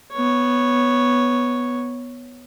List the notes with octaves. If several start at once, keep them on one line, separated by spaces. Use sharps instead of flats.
B3 C#5